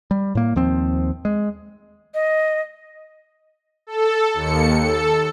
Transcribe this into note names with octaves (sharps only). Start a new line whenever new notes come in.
G3
A2 A#3
D#2 F3 C4
G#3
D#5
A4
D#2 C#7
A4